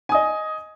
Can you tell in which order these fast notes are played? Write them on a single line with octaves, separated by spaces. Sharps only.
G#5 D#6 D#5